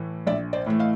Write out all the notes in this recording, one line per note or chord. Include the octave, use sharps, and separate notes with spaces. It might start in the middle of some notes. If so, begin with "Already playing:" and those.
Already playing: A2 E3 A3
A#1 D5 E5
C5 D5
A2 E3 A3
D#5 F5